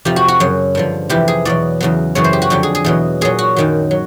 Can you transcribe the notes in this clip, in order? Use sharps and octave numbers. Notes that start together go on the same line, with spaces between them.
F2 C3 F3 G4
F#4
F#4
F#2 C#3 F#3
G2 D3 F3
F2 C3 E3 G4
G#4
E2 B2 F#3 D5
E2 C#3 F#3
F#2 C#3 E3 C#5
C5
G4
F#4
F2 D3 F#3 G4
G#4
G#4
E2 B2 F#3
A#2 F#3 G#4
F#4
F#2 D#3 F#3
F#3